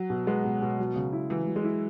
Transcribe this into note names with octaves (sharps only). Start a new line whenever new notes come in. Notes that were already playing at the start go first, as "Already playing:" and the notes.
Already playing: F#3
B2
G#3 B3
B2
B2
F#3
C#3
E4
E3 F#3
F#3
G#3
E4